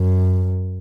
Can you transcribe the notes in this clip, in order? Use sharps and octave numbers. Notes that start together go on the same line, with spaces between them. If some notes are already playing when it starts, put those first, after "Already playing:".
Already playing: F#2